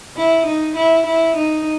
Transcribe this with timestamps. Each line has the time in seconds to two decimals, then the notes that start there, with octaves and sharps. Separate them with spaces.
0.17 E4
0.46 D#4
0.76 E4
1.06 E4
1.36 D#4